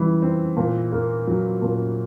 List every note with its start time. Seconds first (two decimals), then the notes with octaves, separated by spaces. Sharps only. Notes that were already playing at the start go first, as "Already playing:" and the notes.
Already playing: E3 G3
0.22 C4
0.57 A#2
0.92 A#3
1.27 F#3
1.62 A#2